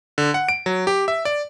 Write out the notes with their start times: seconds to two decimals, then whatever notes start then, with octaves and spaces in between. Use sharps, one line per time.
0.18 D3
0.34 F#5
0.49 D7
0.66 F#3
0.87 G4
1.08 E5
1.25 D5